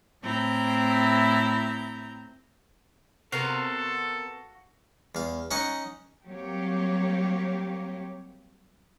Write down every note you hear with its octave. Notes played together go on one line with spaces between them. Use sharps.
A2 C4 E4 A#5 G6
C3 B3 F#4 A4 A#4 F5
E2 F5
C#4 D#4 D#5 F#5
F#3 G3 A#3 C4 G4 C#5